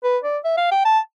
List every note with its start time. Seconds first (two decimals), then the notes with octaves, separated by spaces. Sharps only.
0.04 B4
0.24 D5
0.44 E5
0.57 F5
0.71 G5
0.85 A5